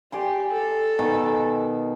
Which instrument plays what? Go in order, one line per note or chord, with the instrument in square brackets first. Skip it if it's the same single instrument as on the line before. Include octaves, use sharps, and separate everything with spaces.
[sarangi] G4 [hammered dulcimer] D5 G#5 C6
[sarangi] A4
[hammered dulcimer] B2 D#3 G#5